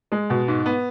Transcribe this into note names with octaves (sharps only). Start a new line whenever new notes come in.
G#3
B2
G#2
B3